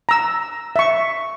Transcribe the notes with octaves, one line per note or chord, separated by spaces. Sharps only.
A#5 E6
E5 C#6